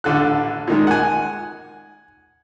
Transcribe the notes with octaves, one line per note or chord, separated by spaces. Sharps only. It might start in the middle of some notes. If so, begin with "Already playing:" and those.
A1 D3 A4 F#6
A#2 D#3 G#3
F#5 G#5